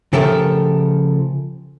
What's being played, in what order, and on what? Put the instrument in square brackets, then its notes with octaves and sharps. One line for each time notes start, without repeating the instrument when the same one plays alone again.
[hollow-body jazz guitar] C#3 F3 A3 G4 A4 A#4